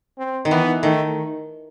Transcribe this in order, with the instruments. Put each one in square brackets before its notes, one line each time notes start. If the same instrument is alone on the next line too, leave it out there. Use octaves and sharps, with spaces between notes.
[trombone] C4
[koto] D#3
[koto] E3 [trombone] B3
[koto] D#3 [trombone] A3